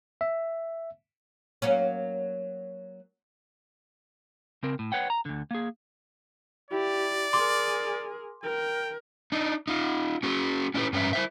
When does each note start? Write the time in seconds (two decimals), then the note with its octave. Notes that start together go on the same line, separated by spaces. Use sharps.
0.21 E5
1.62 F#3 A#3 C#4
4.63 C#3 C4 A#4
4.79 A2
4.92 B4 C#5 F#5 G5
5.10 A#5
5.25 D2 D3
5.51 A#3 G#4
6.71 E4 G4 D5
7.33 G#4 A#4 C6 D6
8.43 A#4 G5
9.32 D4 D#4
9.68 D#4 F4
10.23 C#4 F#4 G#4
10.74 C#4 D4 E4 G4 B4
10.93 G2 C#4 B4 C#5 E5
11.13 E4 C5 E5